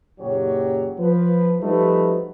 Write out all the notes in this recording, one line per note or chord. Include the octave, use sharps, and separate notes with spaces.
F#1 A#2 F#3 G4 C#5
F3 B4
F3 G3 A3 D#4 F#4 B4